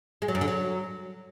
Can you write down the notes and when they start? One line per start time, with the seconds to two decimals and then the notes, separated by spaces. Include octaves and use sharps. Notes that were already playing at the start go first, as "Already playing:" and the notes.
0.22 G#3
0.28 F#3
0.35 F#2
0.41 D3
0.48 F#3